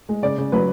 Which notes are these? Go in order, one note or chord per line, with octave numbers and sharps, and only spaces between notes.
G#3
C#3 D5
C#3
F#3 B4